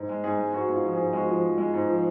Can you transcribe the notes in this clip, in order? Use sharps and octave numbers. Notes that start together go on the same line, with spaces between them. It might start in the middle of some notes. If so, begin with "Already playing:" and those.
Already playing: G#2
G#3
G#2 G#4
G#3
G#2 F#4
G#2 F4
F3
G#4
G#2
G#3 F#4
F3
F3
G#3
G#2
F3